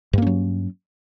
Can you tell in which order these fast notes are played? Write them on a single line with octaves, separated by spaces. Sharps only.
G2 A#3 C#4 F#3